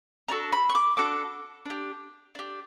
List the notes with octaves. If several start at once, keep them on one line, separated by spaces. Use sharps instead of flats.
D4 F#4 A4 A#5
B5
C#6
D6
D4 F#4 A4 D6
D4 G4
D4 G4